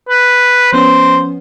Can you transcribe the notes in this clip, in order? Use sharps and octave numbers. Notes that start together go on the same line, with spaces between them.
B4
F3 B3 C#4 C5